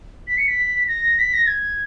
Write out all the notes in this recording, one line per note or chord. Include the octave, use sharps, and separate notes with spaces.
B6
C#7
B6
A#6
B6
A#6
G#6